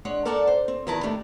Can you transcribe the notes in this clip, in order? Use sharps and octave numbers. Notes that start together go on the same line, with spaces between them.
G#3 D4 C#5 F#5
A4 A#4 D5 F#5 A5
C5
C4
E2 D#3 E4 B4 A5 A#5
D#3 A3 D4 G4